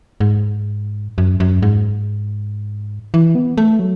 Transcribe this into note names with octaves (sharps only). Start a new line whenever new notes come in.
G#2
F#2
F#2
G#2
E3
B3
A3
F#3